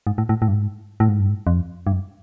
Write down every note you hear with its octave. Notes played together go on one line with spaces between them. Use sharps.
G#2
A2
A2
A2
G2
G#2
A2
G#2
G2
G#2
F2
G2
F#2